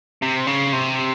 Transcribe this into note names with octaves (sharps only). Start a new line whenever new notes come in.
C3
C#3
C3